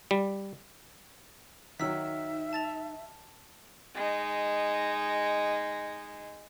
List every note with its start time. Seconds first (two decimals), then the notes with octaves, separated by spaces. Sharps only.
0.11 G3
1.80 D#3 F#3 D#4 E5 E6 B6
2.53 A5 A6 F7
3.95 G#3 D#4